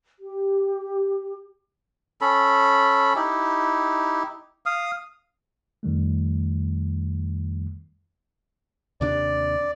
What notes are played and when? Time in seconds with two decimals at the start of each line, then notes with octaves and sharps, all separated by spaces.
0.20 G4
2.21 C#4 A4 B5
3.16 D#4 E4 G4
4.66 F5 D#6
5.83 F2 D#3 G3 A3
9.01 D#2 C3 D4 D5